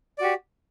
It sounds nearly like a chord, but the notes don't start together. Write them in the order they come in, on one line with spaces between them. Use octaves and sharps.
D5 F#4 G4